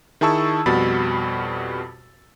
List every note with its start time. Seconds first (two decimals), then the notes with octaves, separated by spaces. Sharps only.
0.21 D#3 E4 G#4 A5 C#6 E6
0.66 F2 B2 G3 F#4 B5 A6